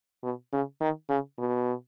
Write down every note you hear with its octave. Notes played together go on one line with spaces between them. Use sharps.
B2
C#3
D#3
C#3
B2